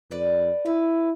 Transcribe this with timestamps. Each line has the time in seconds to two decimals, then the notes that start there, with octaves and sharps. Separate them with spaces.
0.11 F2 B4 D5
0.66 E4 B4